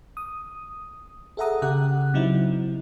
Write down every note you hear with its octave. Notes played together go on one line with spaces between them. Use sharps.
D#6
G#4 A4 E5 F#5 A#5 D#6
C#3 G4 F#5 F#6
C#3 F#3 C4 D#4 E4